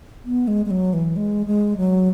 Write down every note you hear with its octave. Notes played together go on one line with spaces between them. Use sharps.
B3
G#3
G#3
F#3
E3
G#3
G#3
F#3